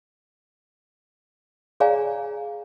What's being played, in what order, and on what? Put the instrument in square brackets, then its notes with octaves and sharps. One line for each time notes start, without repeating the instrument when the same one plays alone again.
[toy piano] G#4 C#5 D5 F5 G#5 A#5